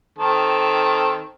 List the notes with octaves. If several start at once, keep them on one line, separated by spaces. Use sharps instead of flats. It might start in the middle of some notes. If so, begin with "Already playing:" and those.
D#3 C4 A4